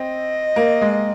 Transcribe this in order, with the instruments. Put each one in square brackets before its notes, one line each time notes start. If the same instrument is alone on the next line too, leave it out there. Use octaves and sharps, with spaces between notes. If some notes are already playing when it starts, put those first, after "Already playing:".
Already playing: [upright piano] C4 [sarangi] D#5
[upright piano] A#3
G#3